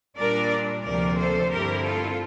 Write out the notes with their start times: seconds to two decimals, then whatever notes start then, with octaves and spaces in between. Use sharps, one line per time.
0.17 A#2 G3 D4 A#4 D5
0.84 D2 C3 F3 A#3 A#4 D5
1.18 A4 C5
1.51 G2 D3 A3 C4 E4 G4 A#4
1.85 F4 A4